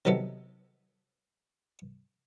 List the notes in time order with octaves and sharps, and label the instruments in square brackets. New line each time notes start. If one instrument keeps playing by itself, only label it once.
[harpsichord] C3 D#3 F#3 B3 A4